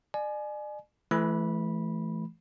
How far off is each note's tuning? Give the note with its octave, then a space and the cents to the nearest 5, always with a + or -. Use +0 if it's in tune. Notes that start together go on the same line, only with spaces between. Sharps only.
D5 +40 G#5 +25
E3 +20 A3 -20 B5 -15